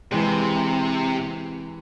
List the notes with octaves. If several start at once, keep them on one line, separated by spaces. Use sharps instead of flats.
C3 E3 G#3